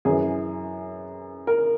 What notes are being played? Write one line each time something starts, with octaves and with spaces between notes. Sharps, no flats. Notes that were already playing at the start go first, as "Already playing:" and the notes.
F#2 E3 G#4
A#4